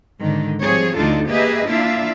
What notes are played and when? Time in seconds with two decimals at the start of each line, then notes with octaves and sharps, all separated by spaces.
0.21 G#2 D3 D#3
0.62 F3 G3 C4 G#4 C#5
0.96 D2 D4 D#4 F4 A4
1.30 A#3 G4 G#4 B4 D#5 E5
1.67 A#3 D4 E4 F4 E5 F5